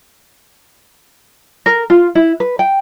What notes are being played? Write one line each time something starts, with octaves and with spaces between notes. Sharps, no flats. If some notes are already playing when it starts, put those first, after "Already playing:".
A#4
F4
E4
B4
G5